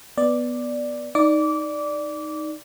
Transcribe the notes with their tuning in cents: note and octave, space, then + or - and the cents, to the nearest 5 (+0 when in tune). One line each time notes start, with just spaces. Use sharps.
B3 +0 D5 +0
D#4 +0 D5 +0 D6 -20